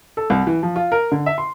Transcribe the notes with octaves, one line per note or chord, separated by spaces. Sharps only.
A4
C2
E3
F3
F4
A#4
D3
E5
C6